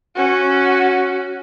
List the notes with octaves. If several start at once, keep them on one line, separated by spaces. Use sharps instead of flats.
C#4 F#4